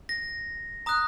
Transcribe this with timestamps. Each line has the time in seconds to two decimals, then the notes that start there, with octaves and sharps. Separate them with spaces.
0.09 A#6
0.86 A#5 D#6 F#6